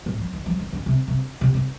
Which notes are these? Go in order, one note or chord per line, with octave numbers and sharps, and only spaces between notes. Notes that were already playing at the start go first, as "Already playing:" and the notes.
A2
F3
D#3
F3
D#3
D3
C3
C3
C3
C3